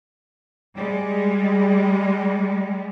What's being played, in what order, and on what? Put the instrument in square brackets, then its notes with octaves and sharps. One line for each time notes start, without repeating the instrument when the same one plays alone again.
[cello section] G3 G#3